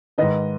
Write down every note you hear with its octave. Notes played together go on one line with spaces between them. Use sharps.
G#2 D#3 B4 D#5